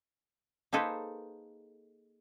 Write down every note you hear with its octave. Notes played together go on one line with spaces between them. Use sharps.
A#3 D#4 G#4 A4 B4 C5